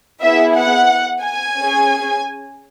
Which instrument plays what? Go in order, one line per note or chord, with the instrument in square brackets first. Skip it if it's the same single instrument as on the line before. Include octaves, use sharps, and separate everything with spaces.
[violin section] B3 E4 G#4 E5
F#5
G#5
C#4 G#4